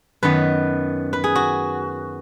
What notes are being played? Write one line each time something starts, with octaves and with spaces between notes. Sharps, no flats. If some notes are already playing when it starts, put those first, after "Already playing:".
F#2 D#3 B3 B4
B4
G#4
F#4